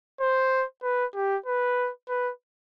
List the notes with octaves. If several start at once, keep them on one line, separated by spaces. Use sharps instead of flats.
C5
B4
G4
B4
B4